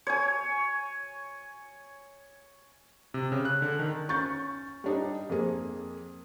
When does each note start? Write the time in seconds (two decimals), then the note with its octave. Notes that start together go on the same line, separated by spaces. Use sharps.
0.07 C#5 G#5
3.14 C3
3.32 C#3
3.45 F#6
3.62 D3
3.79 D#3
4.09 C#4 C#6 G6 A6
4.84 G3 D4 D#4
5.30 F2 A#3 G#4